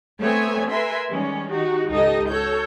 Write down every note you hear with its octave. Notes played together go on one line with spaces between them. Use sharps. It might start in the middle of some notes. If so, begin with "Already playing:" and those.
A3 B3 C4 C#5 E5 G#5
A#4 B4 E5 G#5 C6
D#3 G3 G#3 C#4
D#4 F#4 G4
C#2 G#2 D#4 G4 A4 D#5
F#4 A4 C#5 G6